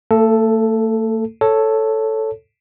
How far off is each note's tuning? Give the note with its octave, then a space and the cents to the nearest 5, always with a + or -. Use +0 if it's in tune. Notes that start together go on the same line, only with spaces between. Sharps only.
A3 +40 A4 +0
A4 +0 C#5 +0